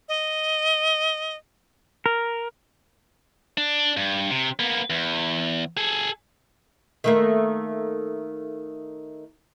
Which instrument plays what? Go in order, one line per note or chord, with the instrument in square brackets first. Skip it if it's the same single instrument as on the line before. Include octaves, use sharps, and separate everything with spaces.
[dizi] D#5
[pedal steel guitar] A#4
[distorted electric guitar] D4
G2
C3
A#3 B3
E2
G#4 A4
[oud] D#3 A3 A#3